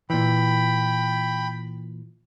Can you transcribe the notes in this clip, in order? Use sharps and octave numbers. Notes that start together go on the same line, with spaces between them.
A#2 E3 G5 B5